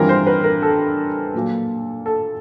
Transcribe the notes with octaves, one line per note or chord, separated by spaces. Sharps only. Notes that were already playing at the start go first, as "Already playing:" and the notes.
Already playing: G2 E3 G3 C4 F4 A#4
C5
B4
A#4
A4
A#2 F#3 A#3
A4